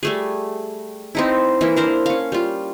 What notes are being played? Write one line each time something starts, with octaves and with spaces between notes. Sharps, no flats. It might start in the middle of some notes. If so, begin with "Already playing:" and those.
G3 A3 G#4
C4 D#4 E4
E3 A#3 E4
D4 A#4 C5
C#4 F5
G3 F4